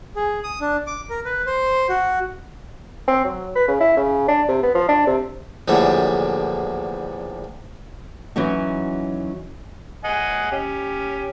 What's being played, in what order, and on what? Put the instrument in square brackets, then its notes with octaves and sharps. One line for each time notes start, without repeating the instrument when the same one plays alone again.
[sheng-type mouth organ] G#4
D#6
D4
D6
A#4
B4
C5
F#4
[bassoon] C4
F#3
B4
C#3
E4
C#3
D4
C3
B3
F3
D4
C3
[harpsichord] A#1 E2 A2 D3 G3
[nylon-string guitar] E3 F#3 C#4 D#4 F#4
[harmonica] D#5 F#5 G#5
C#4 G4